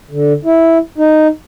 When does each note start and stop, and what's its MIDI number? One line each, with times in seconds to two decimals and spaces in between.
0.11 0.33 50
0.45 0.78 64
0.98 1.27 63